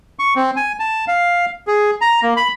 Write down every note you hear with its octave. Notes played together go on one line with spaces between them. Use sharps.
C#6
C4
G#5
A5
F5
G#4
A#5
A#3
B5